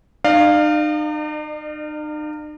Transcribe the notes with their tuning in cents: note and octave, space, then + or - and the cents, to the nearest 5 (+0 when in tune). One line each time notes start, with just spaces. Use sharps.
D#4 -40 D5 +40 F5 +0